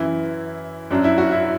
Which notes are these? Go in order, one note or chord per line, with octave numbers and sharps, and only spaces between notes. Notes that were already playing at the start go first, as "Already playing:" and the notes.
Already playing: F#2 E3 E4
F#2 F#3 D4
E4
F#4
E4